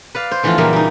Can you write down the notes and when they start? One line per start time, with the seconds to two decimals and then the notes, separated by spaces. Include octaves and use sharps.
0.15 B4 D5 F5
0.31 C5
0.43 D3 E3 F3 A3 B3 F4
0.58 A#2 C#3 E3 F#3 G3 A#3
0.73 G3 D#4